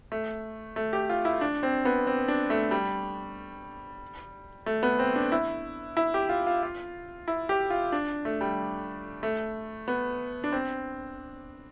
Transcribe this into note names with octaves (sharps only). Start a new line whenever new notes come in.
A3
A3
G4
F4
E4
D4
C4
B3
C4
D4
A3
G3
A3
B3
C4
D4
E4
E4
G4
F4
F4
F4
E4
G4
F4
D4
A3
G3
A3
B3
D4
C4